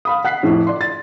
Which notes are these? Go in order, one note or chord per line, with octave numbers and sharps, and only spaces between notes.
F5 B5 D#6
F#5 F#6 B6 C7
F2 A2
D5 C6
A6